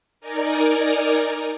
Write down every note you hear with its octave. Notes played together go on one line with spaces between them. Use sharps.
D#4 A#4 D5 G#5 A#5